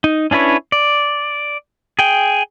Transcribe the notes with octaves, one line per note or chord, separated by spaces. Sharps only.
D#4
C#4 D4 E4 B4 C#5
D5
G#4 G5